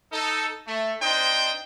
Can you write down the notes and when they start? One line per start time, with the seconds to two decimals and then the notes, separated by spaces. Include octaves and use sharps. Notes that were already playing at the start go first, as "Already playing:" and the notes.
0.12 D#4 A4
0.67 A3
1.01 C4 D4 D#4 C5 D#5 G5